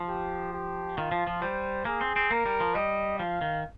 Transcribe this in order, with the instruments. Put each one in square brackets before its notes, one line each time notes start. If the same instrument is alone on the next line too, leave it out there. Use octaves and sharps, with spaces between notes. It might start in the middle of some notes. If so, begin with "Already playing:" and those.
Already playing: [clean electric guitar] F3
[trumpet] G4
G4
[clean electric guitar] D#3 [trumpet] F4
[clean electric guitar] F3
F3
[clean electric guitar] G3 [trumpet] C5
[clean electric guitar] A#3 [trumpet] G#4
[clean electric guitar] C4
C4
[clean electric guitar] A#3 [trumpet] A#4
[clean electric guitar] G3
F3
[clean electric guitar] G3 [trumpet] D#5
[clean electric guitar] F3 [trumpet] F5
[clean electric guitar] D#3